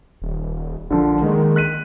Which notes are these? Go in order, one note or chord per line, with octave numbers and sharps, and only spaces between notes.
D#1
A#1 D3 F3
D#3 G#3 A#3
F#6 B6 D#7